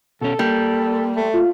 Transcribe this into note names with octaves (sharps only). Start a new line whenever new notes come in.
B2 C#4 A4
G3 A#3
A3
F4